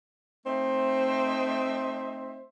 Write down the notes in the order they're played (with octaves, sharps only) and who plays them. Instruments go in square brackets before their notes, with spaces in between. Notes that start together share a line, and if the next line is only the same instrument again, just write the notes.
[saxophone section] A3 C4 D#4 C5 E5